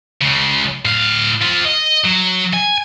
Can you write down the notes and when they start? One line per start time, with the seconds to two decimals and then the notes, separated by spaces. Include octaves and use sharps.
0.21 C#2 C#3
0.85 A2 F5
1.41 C4 F4
1.65 D#5
2.04 F#3
2.54 G#5